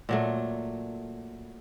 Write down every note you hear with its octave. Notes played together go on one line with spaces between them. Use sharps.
A#2 F#3 A3